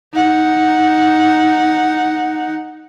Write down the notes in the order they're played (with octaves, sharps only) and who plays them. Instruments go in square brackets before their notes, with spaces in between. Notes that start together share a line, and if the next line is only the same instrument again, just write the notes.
[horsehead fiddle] D#4 F#5